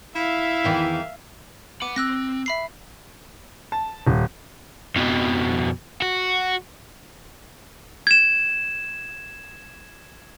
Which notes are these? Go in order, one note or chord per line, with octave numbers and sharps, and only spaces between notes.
E4 E5 F5
E2 D#3 E3
F#5 B5 D6
C4 E6 F#6 A#6
E5 B5 C7
A5
D#1
F2 B2
F#4
G#6 E7